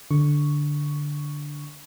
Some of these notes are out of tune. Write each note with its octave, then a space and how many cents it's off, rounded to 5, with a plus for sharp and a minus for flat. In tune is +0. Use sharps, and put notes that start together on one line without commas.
D3 +0 C#6 +0